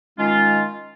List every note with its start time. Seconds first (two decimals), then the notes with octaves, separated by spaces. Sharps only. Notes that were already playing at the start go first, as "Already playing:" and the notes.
0.19 D#3 G#3 C#4 F4